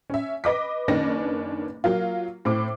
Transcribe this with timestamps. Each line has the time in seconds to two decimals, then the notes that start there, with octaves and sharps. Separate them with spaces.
0.10 C#4 E5
0.44 B4 D#5 D6 B6
0.88 F#1 D#3 C#4 D4 B4 A#6
1.84 F#3 A#3 F4
2.45 A2 C4 D6